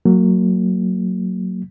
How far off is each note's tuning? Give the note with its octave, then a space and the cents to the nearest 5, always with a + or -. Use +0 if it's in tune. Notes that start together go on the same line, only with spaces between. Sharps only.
F#3 +0 A#3 -30